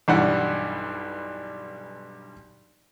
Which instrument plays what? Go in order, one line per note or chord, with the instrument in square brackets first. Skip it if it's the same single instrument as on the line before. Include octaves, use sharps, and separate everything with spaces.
[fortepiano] B1 G2 E3 F#5